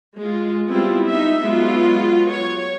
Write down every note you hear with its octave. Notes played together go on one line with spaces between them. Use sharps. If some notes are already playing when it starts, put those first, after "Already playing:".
G#3 F4
G3 B3 C4 E4 F4
D#4 E5
F#3 G#3 B3 F4
C#5